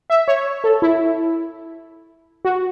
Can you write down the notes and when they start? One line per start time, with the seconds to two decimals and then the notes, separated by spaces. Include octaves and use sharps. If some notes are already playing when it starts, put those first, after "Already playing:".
0.10 E5
0.28 C#5
0.64 A4
0.82 E4
2.45 F#4